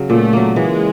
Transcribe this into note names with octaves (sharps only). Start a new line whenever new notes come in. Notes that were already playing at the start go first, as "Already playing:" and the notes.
Already playing: C#3 F#3
A#2 A3
F#3 A#3
E3 G#3